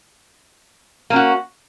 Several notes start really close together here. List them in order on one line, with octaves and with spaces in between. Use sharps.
A#3 C#4 F#4